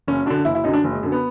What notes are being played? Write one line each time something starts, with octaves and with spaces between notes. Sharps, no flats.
F#1 C#4
F#2 D3 D4
F#1 E4
E4
F#2 D3 D#4
D4
F#1
G#3
F#2 D3
B3